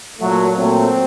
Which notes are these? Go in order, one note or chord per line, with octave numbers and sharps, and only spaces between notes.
A#2 F#3 A3
A#2 F#3 A3 C4